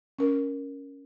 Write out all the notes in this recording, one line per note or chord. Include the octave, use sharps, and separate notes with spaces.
C#4 A#4